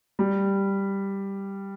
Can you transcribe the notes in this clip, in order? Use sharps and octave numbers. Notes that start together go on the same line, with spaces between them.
G3